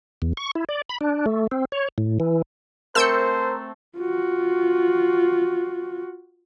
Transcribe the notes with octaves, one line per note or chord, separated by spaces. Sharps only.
E2
C#6
E4
D5
B5
D4
A3
C4
C#5
A2
E3
A3 C4 A4 A#4 C5 E6 G6 C#7
F4 F#4